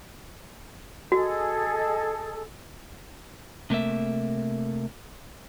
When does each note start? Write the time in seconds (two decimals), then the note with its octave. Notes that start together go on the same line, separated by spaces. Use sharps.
1.12 F#4 G#4 A4 D#5
3.70 C3 A3 A#3 E5